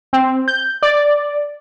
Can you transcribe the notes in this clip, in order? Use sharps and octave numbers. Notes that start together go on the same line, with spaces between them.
C4
G6
D5